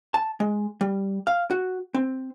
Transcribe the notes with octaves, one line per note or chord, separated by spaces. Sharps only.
A5
G#3
G3
F5
F#4
C4